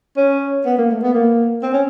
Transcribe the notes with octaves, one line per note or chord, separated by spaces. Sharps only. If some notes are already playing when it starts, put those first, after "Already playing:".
C#4
B3
A#3
A3
B3
A#3
C4
C#4